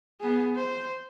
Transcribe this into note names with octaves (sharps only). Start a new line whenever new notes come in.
B3 G#4
C5